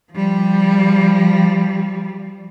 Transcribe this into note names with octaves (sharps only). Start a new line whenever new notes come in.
F3 G3